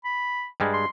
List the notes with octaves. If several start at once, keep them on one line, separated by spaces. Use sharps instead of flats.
B5
G2 G3 G#3
C6